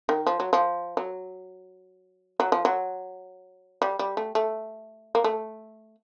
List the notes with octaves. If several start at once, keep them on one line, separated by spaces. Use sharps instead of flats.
D#3
F3
F#3
F3
F#3
F#3
F3
F#3
G3
G3
A3
A3
A#3
A3